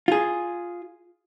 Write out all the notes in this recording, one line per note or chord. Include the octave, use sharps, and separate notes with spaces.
F4 G#4